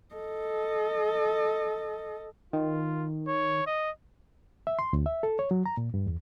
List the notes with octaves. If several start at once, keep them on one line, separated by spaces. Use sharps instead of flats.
A4 D#5
D#3 F4
C#5
D#5
E5
C6
D2
E5
A4
C#5
F#3
A#5
A#2
G2
E2